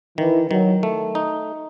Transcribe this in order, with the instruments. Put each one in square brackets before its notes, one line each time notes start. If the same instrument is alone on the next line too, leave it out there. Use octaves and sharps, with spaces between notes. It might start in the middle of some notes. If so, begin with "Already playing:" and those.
[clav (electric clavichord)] D#3 [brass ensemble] E3
[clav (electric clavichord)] D#3 [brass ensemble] F#3
[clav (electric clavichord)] A3
D#4